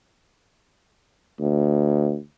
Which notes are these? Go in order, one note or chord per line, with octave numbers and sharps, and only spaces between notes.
D2